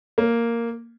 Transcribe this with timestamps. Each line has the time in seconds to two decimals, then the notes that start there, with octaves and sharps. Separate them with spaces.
0.18 A#3